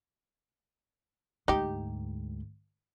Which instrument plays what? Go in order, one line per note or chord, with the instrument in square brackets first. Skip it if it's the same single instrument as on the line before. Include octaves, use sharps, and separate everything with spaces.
[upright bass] D2 G#2 [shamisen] D#4 G4